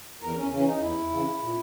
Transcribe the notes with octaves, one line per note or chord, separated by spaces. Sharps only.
E2 A#4
C#4
C#3 E3 C#4
D#4
E2 E4
C#3 E3
A#2